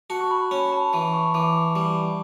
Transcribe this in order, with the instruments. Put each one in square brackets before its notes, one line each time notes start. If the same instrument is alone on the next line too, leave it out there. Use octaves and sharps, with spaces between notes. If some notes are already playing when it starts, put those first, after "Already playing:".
[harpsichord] F#4 [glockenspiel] A5
[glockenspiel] C#6
B5
[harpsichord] C#4 [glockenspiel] B5
[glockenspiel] A5
[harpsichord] E3 [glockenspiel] B5
[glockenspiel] C#6
[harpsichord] E3 [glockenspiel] D6
[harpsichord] G3